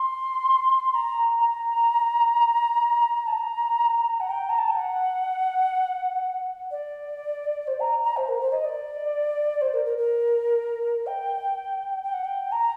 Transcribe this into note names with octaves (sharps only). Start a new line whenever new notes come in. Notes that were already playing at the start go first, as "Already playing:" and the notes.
Already playing: C6
C6
A#5
A#5
A5
A#5
F#5
G5
A#5
A5
G5
F#5
D5
C5
A#5
A#5
C5
A#4
C5
D#5
D5
C5
A#4
A#4
A#4
G5
G5
F#5
G5
A#5